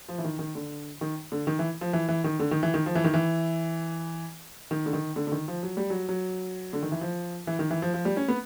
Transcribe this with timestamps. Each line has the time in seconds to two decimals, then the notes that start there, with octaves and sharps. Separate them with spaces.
0.09 F3
0.18 E3
0.24 D#3
0.39 D#3
0.55 D3
1.01 D#3
1.32 D3
1.47 D#3
1.59 E3
1.81 F3
1.93 E3
2.08 E3
2.24 D#3
2.39 D3
2.51 D#3
2.63 E3
2.74 D#3
2.86 F3
2.95 E3
3.04 D#3
3.14 E3
4.71 D#3
4.86 D3
4.93 D#3
5.16 D3
5.27 D3
5.32 D#3
5.48 F3
5.63 F#3
5.77 G3
5.90 F#3
6.09 F#3
6.73 D3
6.83 D#3
6.92 E3
7.01 F3
7.47 E3
7.59 D#3
7.70 E3
7.82 F3
7.94 F3
8.05 G3
8.17 C#4
8.28 B3